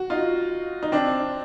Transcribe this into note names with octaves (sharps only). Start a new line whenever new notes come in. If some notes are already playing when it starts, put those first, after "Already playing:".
Already playing: F#4
D#4 F4
D#4
C4 D4